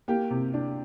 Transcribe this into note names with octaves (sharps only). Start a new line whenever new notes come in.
A#3 G4
C3
D4